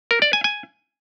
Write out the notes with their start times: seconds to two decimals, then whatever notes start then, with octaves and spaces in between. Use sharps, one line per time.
0.11 A#4
0.22 D5
0.33 G#5
0.44 G#5